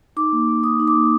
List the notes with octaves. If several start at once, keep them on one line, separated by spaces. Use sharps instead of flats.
D#4 D6
A#3
A#3
D#4 D#6
D#4
D6
A#3